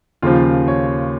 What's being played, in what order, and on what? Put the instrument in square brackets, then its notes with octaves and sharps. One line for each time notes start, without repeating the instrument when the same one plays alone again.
[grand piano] D#2 C#3 F3 F4
C#5